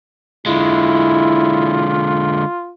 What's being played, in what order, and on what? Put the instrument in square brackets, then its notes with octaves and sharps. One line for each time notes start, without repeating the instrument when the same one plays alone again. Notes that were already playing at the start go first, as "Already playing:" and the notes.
[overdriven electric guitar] D3 G#3 [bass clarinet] E4 [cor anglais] F4